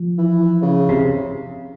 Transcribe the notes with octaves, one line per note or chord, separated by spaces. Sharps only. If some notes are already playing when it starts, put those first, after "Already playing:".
Already playing: F3
E3
C#3
C3